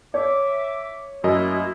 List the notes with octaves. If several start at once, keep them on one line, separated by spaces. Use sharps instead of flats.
C#5 E5 D6
F#2 A3 A#3 E4 F#4 A#4 D#5